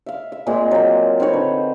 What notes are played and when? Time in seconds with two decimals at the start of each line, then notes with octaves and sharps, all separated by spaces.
0.06 E5 F5
0.32 E5
0.47 A#2 G#3 A#3 C4
0.71 F#3 A#3
1.20 C4 D#4 B4 C#5
1.34 D3